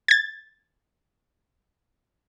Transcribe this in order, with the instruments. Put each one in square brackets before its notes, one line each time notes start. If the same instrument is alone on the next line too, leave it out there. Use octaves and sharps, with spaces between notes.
[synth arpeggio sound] G#6 A6